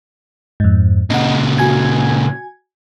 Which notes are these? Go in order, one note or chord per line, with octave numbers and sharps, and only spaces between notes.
F2 G#2
A#2 C#3 D#5 F#5
F#4 G#5 G#6